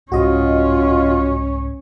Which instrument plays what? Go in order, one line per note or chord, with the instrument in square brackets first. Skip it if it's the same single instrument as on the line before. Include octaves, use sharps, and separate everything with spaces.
[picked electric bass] C2 G#2 [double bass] C#4 [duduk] F4 [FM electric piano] F#4 D#5